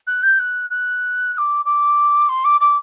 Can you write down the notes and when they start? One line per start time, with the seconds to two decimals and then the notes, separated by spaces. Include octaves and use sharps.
0.07 F#6
0.23 G6
0.39 F#6
0.70 F#6
1.34 F#6
1.38 D6
1.65 D6
2.29 C6
2.45 D6
2.61 D6